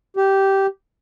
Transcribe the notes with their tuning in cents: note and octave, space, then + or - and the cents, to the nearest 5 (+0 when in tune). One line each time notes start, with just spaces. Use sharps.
G4 -10